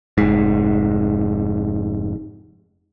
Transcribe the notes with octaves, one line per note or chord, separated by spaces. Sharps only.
F1 G#2